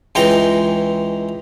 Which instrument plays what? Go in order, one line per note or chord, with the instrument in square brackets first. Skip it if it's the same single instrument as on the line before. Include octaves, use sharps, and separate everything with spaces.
[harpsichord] C#2 E3 G#3 D#4 G5 A#5